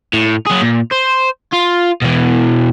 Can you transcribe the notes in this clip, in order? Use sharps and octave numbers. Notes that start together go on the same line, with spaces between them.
A2
F#3 G#4
A#2
C5
F4
B2 E3